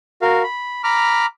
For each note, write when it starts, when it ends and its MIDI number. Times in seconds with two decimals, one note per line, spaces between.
0.22 0.43 66
0.22 0.43 70
0.22 0.43 77
0.44 0.83 83
0.84 1.26 82
0.84 1.26 83
0.84 1.26 86
0.84 1.26 89